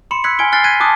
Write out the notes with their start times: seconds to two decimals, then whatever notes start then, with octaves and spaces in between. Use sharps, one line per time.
0.11 B5 C6 C#7 E7
0.24 E6 F#6 G#6 B6 C#7 F#7
0.39 G#5 F6 G#6 D7 G7
0.53 F6 F#6 A6 C7 G7
0.64 F6 F#6 G#6 B6 D#7
0.80 A5 D6 D#6 F#6 A6